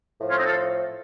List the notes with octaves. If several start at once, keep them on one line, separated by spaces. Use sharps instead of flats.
A2 F3
C#4 F4
C4 D#4
F4 A4